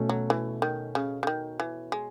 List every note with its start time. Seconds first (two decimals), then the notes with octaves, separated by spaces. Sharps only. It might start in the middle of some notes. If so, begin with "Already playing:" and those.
Already playing: B2 A3 C#4
0.09 F#3
0.30 E3
0.62 D#3
0.95 C#3
1.23 C#3
1.27 D#3
1.60 E3
1.92 G#3